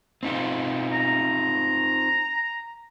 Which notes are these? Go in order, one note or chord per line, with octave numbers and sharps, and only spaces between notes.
C4 D#4 F4
A#5